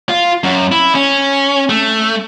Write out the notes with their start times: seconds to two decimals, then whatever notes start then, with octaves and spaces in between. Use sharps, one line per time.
0.09 F4
0.44 F#2
0.72 E4
0.95 C#4
1.69 A3